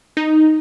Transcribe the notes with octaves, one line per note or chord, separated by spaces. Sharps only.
D#4